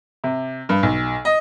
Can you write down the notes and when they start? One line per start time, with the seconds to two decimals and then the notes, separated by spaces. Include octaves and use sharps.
0.24 C3
0.69 G2
0.83 B1
1.25 D#5